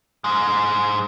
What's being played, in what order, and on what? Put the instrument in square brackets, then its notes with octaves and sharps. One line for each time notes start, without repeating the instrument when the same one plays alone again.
[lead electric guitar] G#2 G#3